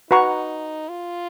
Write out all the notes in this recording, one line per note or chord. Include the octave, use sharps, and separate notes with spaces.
D#4 F#4 B4 F#5 A#5 C#6
F4